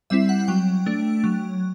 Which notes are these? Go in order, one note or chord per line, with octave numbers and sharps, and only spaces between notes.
G3 C4 E4 E5
F#5
F#3 G5
A3 D4
F#3